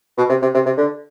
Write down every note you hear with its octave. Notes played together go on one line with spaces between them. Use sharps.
B2
C3
C3
C3
C3
D3